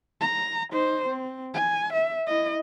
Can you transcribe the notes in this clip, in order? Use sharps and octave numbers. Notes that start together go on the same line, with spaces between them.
A#5
D#4 C5
C4
G#5
E5
E4 D#5